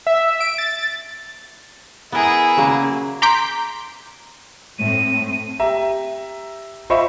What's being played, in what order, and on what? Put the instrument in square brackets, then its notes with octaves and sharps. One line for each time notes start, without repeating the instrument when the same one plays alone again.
[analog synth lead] E5
D7
A6
[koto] B3 A#4 [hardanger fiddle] E4 G#4
[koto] C#3 F#3 A#3
[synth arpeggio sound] A#5 C6 D6 G6 B6 D7
[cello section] A2 A3 C4 [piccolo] D#7
[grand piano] G4 E5 A#5
F4 C5 D#5 E5 B5 C#6